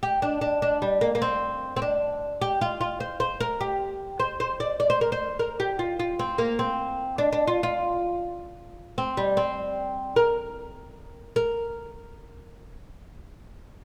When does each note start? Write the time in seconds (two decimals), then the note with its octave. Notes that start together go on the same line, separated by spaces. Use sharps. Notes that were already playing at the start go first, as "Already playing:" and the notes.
0.03 G4
0.22 D4
0.41 D4
0.62 D4
0.82 G3
1.01 A#3
1.15 A#3
1.22 C4
1.76 C4
1.82 D4
2.42 G4
2.61 F4
2.81 F4
3.00 C5
3.20 C5
3.40 A#4
3.61 G4
4.20 C5
4.40 C5
4.60 D5
4.80 D5
4.90 C5
5.01 A#4
5.12 C5
5.39 A#4
5.60 G4
5.79 F4
6.00 F4
6.19 C4
6.38 A#3
6.59 C4
7.18 D4
7.33 D4
7.48 F4
7.63 F4
8.98 C4
9.17 G3
9.37 C4
10.16 A#4
11.36 A#4